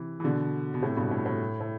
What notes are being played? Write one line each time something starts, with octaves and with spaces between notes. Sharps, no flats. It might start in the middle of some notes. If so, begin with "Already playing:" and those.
Already playing: C3 E3
E3
B2 D3
B2
A2 C3
G2 B2
A2
A2
A2